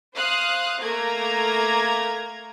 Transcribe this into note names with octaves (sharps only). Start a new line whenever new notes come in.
C5 F5 D#6 F#6
A3 A#3 A#5 G#6